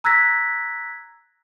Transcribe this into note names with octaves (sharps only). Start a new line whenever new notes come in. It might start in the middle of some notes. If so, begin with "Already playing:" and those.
A#5 E6 F#6 G#6 A#6 B6